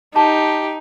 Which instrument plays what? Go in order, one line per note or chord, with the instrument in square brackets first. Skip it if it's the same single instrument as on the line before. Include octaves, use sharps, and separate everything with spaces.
[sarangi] D#4 [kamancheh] G4 [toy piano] A5